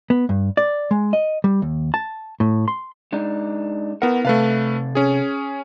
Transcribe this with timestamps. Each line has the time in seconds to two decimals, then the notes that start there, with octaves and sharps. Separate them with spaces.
0.10 B3
0.29 G2
0.57 D5
0.91 G#3
1.13 D#5
1.44 G3
1.62 D#2
1.94 A5
2.40 A2
2.68 C6
3.12 G#3 D4 D#4
4.02 B3 E4 A#4 F#5
4.25 C3 A3 A4 B4 F5
4.95 C#4 G#4